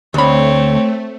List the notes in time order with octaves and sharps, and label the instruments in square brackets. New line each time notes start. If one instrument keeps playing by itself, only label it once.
[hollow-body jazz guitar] D2 B5 [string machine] A3 [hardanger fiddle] C4 C#5